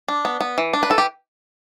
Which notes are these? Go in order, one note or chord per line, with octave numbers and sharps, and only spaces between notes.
D4
B3
B3
E3
D4
B4
E3 A4
G4